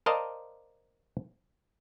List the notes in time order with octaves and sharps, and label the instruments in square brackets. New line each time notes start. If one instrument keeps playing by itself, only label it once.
[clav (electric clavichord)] A#4 C5 D5 D#5 F5 A5